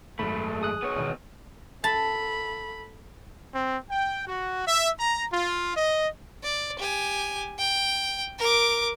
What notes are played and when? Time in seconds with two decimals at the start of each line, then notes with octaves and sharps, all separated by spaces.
0.19 G#1 F#2 G#3 A3 B5
0.62 G#4 D#6 F#6
0.83 B3 C#5
0.96 E1 B2 D#3
1.84 A4 A5 B5
3.53 C4
3.90 G5
4.27 F#4
4.67 E5
4.98 A#5
5.32 F4
5.76 D#5
6.43 D5
6.79 G4 G#5
7.59 G5
8.39 A#4 D6